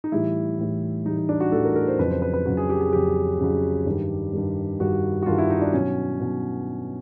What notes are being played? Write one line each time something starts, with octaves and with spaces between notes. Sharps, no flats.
D#4
A2 E3 G3 E4
A2 E3 G3
A2 E3 G3 D#4
D#4
D4
F#4
A2 E3 G3 A4
A#4
A#4
C5
F2 C#3 F#3 B4
C5
B4
B4
F2 C#3 F#3
G#4
G4
G#4
F2 C#3 F#3 G4
F2 C#3 F#3
G2 D#3 G3
G2 D#3 G3
G2 D#3 G3 F#4
F#4
G2 D#3 G3 F4
E4
D#4
D4
B2 F#3 C#4
B2 F#3